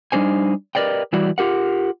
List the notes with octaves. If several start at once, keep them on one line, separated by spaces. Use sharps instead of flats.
G3 D4 D#4 C5 G#5
G4 A#4 B4 D5 D#5 G5
E3 G3 E4 F#4 D5
F4 G4 A#4 F#5